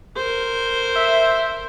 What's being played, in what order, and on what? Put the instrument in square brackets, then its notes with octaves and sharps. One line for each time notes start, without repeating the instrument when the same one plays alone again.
[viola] A#4 C5
[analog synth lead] E5